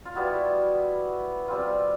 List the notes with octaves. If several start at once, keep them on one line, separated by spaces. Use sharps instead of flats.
F4
G3 B3 E4 F#4
G3 C4 F4